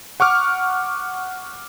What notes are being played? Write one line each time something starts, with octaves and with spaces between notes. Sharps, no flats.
F#5 C#6 D6 F6